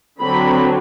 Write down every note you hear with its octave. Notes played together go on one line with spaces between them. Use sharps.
D3 F#3 C4 B5